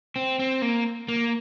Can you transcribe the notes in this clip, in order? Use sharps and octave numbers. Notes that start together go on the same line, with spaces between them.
C4
C4
A#3
A#3